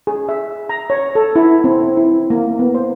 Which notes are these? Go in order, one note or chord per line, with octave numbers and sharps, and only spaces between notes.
G#4
E5
A#5
C#5
A4
E4
C4
E4
A#3
B3
C5